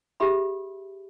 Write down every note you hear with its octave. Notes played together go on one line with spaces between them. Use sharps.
G4 G#4 E5 B5